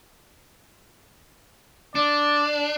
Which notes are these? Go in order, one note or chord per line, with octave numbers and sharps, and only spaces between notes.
D4 D5